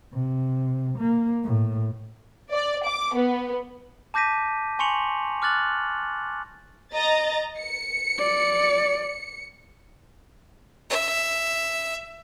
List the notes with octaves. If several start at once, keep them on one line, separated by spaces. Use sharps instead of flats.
C3
A#3
A2
D5
D6
B3
A5 D6 G6 A#6 B6 D#7
G#5 C6 C#6 C#7 F7 F#7
D6 F6 F#6 A6 F#7
D#5 A#5 A6
C#7
D5
E5